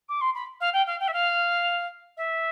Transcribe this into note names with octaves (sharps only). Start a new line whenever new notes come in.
D6
C6
B5
F5
G5
F5
G5
E5
F5
E5